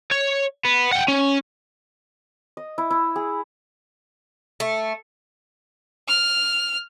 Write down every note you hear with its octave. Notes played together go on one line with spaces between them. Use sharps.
C#5
B3
F#5 G5
C#4
D#5
E4
E4
G#4
A3
F6